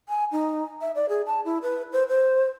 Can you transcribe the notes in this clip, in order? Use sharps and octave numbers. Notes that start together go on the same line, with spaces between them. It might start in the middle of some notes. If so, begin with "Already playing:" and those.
G#5
D#4
E5
D5
G#4
A5
E4
B4
C5
C5